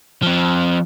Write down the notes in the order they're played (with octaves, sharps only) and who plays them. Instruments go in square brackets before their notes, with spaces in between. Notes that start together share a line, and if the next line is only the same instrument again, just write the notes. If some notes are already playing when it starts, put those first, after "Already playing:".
[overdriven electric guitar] F3 C4